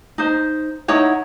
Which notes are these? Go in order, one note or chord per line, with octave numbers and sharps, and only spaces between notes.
D#4 C5
D#4 E4 C#5 F#5